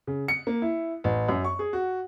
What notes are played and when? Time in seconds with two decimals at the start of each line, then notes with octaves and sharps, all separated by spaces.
0.07 C#3
0.28 C#7
0.47 A#3
0.62 E4
1.04 A1
1.29 F#2
1.44 C#6
1.59 G#4
1.73 F#4